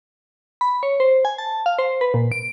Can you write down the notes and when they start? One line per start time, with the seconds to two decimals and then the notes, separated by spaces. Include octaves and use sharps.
0.61 B5
0.83 C#5
1.00 C5
1.25 G#5
1.38 A5
1.66 F5
1.79 C5
2.01 B4
2.14 A#2
2.32 D7